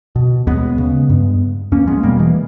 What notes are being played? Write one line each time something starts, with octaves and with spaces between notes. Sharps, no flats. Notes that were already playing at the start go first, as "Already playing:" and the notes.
B2
D#2 G#3 B3
C#3
G2
E2 A#3 C#4
G#3 B3
B2 G3 A#3
E3 G#3